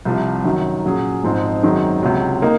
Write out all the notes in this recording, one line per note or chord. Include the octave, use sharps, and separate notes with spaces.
C2 C3 F3
F#2 D#3 F#3
A#2 F#3 C#4 G#4
G#1 G#2 F3 C4 D#4
F#2 D#3 G#3 C4 F#4
C#2 C3 F#3
A#3 D#4